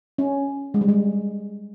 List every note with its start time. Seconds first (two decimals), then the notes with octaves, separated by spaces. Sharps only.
0.18 C#4
0.74 G#3
0.81 G3
0.88 G#3